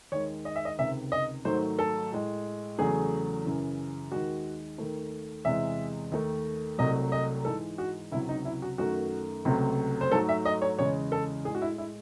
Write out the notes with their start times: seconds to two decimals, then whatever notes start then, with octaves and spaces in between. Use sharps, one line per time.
0.12 D#2 D#3 G#3 C#5
0.45 D#5
0.56 E5
0.65 D#5
0.79 C#2 C3 D#3 E5
1.12 D#5
1.45 G#2 D#3 F#3 A3 C5
1.79 A4
2.12 A2 G#3
2.78 E2 C#3 F#3 A3 G#4
3.45 F#2 C#3 E3
4.12 D#2 D#3 G#3 F#4
4.78 D#2 D#3 A3
5.45 E2 C3 E3 G#3 E5
6.12 D#2 D#3 A3
6.78 C2 C3 F#3 A3 D#5
7.12 D#5
7.45 G#2 E3 G#3 A4
7.78 F#4
8.12 C#2 C3 F#3 E4
8.29 D#4
8.45 E4
8.62 F#4
8.78 F#2 D#3 A3 F#4
9.45 C#2 C3 F#3 A3
10.01 C5
10.12 G#2 F#3 A3 A4
10.29 E5
10.45 D#5
10.62 C#5
10.78 E2 C#3 G#3 C#5
11.12 A4
11.45 A2 G#4
11.50 G#3
11.55 F#4
11.62 E4
11.78 E4